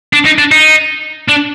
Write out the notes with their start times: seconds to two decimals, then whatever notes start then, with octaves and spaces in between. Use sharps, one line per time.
0.13 D4
0.26 D#4
0.39 D4
0.52 D#4
1.28 D4